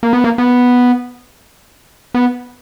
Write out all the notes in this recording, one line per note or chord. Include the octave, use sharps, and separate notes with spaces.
A#3
B3
A#3
B3
B3